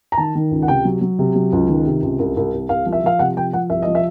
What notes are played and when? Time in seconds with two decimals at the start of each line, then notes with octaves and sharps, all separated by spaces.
0.12 A#5
0.18 D#3 A5
0.35 D#3
0.51 C#2
0.62 F#5
0.68 C3 G5
0.85 F#3
1.01 F#3
1.19 C3
1.35 F#3
1.52 C#2
1.68 D#3
1.86 C3
2.03 C#2
2.19 C2
2.37 C2
2.53 C2
2.69 C2 F5
2.86 F3
2.93 E5
3.03 F3 F5
3.19 C3 F#5
3.36 F3 G5
3.53 F3 F#5
3.70 C2 E5
3.82 F3 D#5
3.95 E5